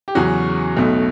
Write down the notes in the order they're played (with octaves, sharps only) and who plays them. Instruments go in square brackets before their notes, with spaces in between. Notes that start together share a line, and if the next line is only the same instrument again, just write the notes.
[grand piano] G4
E2 C#3 F#3 C#4 F#4
B1 B2 A3